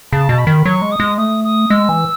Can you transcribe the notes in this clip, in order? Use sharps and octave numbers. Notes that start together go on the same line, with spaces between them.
C#3 A5
B2
B5
D#3
F#3 C#6
G#3
D#6
G#3
A3 D#6
D#6
G#3 E6
E3